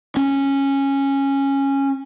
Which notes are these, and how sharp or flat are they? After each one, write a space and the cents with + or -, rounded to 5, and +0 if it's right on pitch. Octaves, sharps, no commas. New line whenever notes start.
C#4 -10